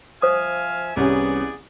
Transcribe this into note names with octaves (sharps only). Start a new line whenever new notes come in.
F3 C5 E5 F5 G#5 D#6
C2 E3 B3 C#4 G#4 D5